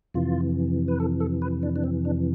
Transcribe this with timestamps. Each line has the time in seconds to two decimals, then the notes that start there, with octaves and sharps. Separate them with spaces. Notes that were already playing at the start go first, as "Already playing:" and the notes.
0.14 F2 C3 E3 F4
0.88 B4
1.00 A4
1.20 A4
1.42 B4
1.63 D4
1.76 D4
1.84 C4
2.05 D4